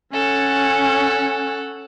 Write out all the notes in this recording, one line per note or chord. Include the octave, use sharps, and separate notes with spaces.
C#4 A4 F#5